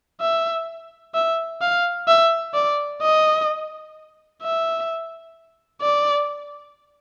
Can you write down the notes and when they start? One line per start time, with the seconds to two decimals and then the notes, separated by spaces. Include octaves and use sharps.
0.21 E5
1.14 E5
1.61 F5
2.08 E5
2.54 D5
3.02 D#5
4.42 E5
5.82 D5